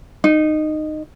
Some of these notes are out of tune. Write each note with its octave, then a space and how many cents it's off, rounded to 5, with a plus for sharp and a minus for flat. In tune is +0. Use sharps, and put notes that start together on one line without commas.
D#4 -15